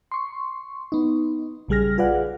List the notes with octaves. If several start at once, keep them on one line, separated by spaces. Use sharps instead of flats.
C6 C#6
B3 D#4
A#1 C#3 G3 G#4 F6 A#6
F4 G#4 B4 D5 F5 F#5